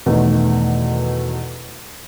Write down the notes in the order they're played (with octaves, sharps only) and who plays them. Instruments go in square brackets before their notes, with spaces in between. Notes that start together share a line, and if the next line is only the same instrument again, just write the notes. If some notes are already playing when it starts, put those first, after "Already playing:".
[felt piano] E2 B2 D#3 A3